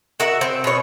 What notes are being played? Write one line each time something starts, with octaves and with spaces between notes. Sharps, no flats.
F#4 A#4 E5 F#5
C4
B2 C#5